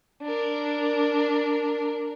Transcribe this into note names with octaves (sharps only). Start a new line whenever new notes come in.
D4 A#4